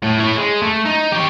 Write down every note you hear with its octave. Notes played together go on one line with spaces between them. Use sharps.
A2 A3
E4 C#5
G#3
A3
D#4
G4 C#5